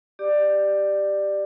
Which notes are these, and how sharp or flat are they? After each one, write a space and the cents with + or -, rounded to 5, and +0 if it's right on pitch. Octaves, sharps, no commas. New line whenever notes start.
G4 +0 D5 +15 D6 +15